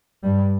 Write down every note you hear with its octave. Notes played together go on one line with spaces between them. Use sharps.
G2 G3